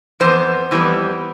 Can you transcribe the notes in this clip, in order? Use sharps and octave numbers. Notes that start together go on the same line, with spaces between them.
F2 E3 B3 C5
F2 E3 G3 B3